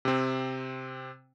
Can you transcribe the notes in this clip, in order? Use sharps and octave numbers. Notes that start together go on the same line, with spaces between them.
C3 C4